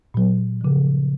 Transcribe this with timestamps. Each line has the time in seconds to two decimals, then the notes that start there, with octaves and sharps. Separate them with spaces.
0.14 A#2 F#3
0.61 C#3 F3